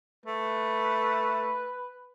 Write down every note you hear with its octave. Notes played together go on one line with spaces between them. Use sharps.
A3 B4